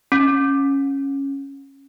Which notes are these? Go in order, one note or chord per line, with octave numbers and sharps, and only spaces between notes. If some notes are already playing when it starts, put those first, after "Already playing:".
C#4